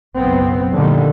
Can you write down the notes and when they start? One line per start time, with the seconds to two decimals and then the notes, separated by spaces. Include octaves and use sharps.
0.16 F#1 B1 B3 C4
0.76 A#2 D3 D#3 F3 G3